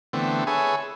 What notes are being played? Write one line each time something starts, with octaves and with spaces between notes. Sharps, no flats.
D3 E3 A3 B3 C4
G#4 A4 B4 C#5 E5 G#5